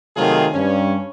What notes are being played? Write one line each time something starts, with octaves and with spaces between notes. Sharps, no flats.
C3 D#3 F#3 A3 F4 G#4
G2 C#4